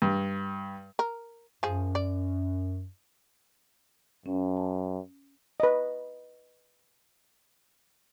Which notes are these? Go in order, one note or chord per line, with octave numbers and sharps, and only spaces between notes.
G2
A#4
F#2 F3 G#4
D5
F#2 C#4
A5
B4 D#5